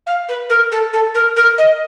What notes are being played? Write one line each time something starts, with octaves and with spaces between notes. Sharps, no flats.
F5
B4
A#4
A4
A4
A#4
A#4
D#5